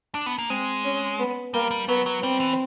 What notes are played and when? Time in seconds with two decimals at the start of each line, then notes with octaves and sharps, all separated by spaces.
0.15 D4
0.26 B3
0.39 A#3
0.50 G#3 C4
0.85 C#4
1.19 B3
1.54 G3 A#3
1.71 G3
1.88 F#3 B3
2.06 F#3
2.23 G3 C4
2.40 E3